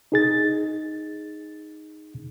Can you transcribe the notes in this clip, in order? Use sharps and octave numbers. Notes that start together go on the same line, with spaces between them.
D#4 G#4 A6